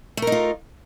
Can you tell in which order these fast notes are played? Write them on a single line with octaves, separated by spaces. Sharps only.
A3 A#4 D#4 F4